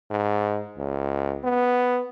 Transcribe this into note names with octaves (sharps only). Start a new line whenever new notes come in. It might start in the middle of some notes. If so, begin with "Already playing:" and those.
G#2
C#2
B3